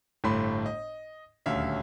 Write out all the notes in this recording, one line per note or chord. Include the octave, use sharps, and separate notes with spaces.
G1 A2 A3 B5 C6
D#5
D#1 D2 C#4 E5 F5